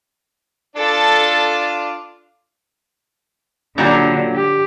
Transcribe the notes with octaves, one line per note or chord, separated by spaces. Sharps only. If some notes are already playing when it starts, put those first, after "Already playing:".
D4 F4 A4 D5 A6
A#2 D3 F#3 G3
G4